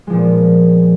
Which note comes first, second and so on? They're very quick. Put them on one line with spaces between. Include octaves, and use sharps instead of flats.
G#3 F3 A#2 B3